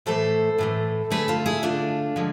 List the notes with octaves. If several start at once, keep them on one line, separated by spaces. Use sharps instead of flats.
A2 E3 A3 A4 C5
A2 E3 A3
D3 A3 G#4 B4
F4 A4
E4 G#4
D3 A3 D4 F4
D3 F3 G#3